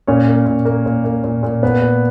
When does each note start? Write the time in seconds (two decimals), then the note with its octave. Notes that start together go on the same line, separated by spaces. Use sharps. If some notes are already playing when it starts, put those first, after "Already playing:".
0.07 A#2 C#4 C#5
0.28 A#3
0.46 A#2
0.65 A#3
0.86 A#2
1.04 A#3
1.24 A#2
1.43 A#2
1.63 B3 B4
1.82 A#2